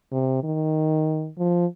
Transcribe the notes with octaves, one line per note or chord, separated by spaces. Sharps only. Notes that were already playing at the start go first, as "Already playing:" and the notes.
C3
D#3
F3